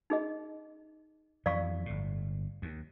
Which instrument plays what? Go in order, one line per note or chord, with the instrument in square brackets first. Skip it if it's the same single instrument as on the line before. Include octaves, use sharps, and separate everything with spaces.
[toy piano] D#4 G#4 D#5
[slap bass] F2 E3 F#3 [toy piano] D5 F5 C#6
[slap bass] G1 A2
D#2